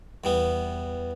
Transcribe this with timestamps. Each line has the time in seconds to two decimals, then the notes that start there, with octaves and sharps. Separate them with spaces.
0.24 E2 G3 B3